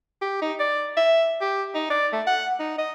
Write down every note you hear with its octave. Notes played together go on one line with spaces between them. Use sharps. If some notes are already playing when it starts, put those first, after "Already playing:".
G4
D#4
D5
E5
G4
D#4
D5
A3
F#5
D#4
D#5